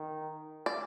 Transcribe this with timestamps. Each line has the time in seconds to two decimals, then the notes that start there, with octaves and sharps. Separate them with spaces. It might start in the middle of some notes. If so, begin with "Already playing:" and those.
Already playing: D#3
0.66 D5